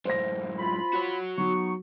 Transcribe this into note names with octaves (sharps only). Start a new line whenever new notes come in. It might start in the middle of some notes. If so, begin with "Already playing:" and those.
F#2 A2 C5 A#6
F4 B5
F#4 C#5
F#3 B3 D#4 C#6